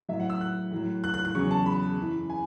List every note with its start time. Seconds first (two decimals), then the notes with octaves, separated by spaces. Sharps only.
0.09 A2 F#3 E5
0.20 F#5
0.30 E6
0.41 F#6
0.71 A2 F#3
1.04 F#6
1.14 F#6
1.25 F#6
1.35 E2 C#3 F#3 C#6
1.51 A5
1.66 B5
1.98 F#2 E3
2.30 G#5